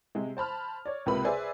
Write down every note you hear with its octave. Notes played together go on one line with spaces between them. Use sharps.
C3 G#3
C5 A5 B5 F6
C#5 D5
C#2 C3 A#3 F4 B4 B5
G#4 B4 C5 D5 E5